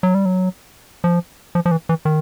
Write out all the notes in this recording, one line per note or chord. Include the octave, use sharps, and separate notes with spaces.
F#3
G3
F#3
F3
F3
F3
E3
E3
D#3